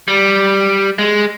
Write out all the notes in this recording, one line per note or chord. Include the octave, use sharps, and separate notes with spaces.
G3
G#3